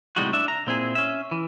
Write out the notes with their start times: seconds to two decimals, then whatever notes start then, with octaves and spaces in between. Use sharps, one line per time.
0.16 C2 A2 G3 G#3 D#4 F#4
0.33 D4 E5
0.48 A#5
0.67 A#2 C4 E4 G#4
0.95 C#4 E5
1.31 E3